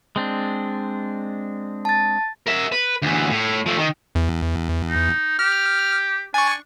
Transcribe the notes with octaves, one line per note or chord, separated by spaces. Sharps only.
G#3 C4 D4
A5 A6
A#4 E5
B4
D2 E3
A2
F3 A3
D#3
E2
D#4
G4 F6
D4 G#5 C#6